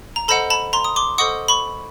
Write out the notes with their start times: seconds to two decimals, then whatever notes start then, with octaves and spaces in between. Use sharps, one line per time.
0.16 A#5
0.28 A4 C5 D#5 F#5 A5 B5
0.50 A5 B5
0.73 A#5 C6
0.84 D#6
0.96 C6 D6
1.18 A4 C5 D#5 F#5 C#6 D#6
1.48 B5 C#6